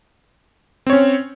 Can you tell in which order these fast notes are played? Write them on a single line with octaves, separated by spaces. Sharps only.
C4 C#5 C#4